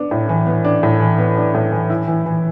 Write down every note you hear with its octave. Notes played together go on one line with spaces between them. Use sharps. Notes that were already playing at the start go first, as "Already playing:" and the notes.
Already playing: B3 D4
A2
E3
B3
D4
A2
E3
B3
D4
A2
E3
E4
E3
E3